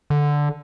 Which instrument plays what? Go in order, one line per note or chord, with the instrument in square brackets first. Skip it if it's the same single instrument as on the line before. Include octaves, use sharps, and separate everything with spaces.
[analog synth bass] D3